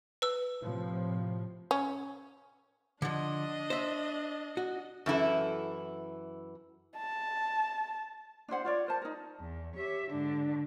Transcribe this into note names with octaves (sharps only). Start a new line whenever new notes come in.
B4 E6
A2 C3 F3
C#4
D3 F3 D4 D#5
C5 E5
F#4
F#2 E3 E4 A4
A5
D4 E4 C5 F#5
F4 C#5 D5
A#4 C5 A5
D#4 A#4
E2
G4 C#5 E5
G#2 D3 D4